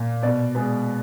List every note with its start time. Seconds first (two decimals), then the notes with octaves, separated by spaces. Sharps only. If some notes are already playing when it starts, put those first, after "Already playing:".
Already playing: A#2
0.23 B2 D5
0.55 G#3 B3